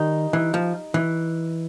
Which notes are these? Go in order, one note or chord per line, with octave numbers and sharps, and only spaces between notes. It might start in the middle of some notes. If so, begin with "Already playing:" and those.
Already playing: D#3 G3 D#4
E3
F3
E3